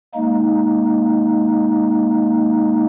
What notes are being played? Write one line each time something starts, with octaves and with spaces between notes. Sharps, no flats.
G#3 A#3 D#4